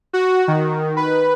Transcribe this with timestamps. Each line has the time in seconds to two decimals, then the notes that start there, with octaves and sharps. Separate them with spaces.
0.13 F#4
0.48 D#3
0.97 B4